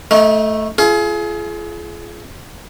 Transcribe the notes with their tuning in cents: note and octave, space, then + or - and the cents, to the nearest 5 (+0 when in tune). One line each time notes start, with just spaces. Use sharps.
A3 +0 D#4 +30
F4 -30 G#4 +30